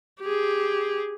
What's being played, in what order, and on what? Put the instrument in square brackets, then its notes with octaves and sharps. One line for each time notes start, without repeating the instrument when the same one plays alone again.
[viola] G4 G#4